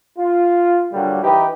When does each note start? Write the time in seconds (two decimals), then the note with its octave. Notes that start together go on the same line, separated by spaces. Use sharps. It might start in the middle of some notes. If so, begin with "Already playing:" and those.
0.17 F4
0.93 A#2 D3 F#3 G3
1.23 E3 D#4 G4 B4